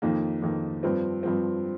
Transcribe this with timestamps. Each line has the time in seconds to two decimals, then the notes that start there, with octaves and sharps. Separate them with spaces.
0.02 F2 D#3 A#3 D#4
0.42 F2 D#3 A#3 D#4
0.83 G2 F3 C4
1.23 G2 F3 C4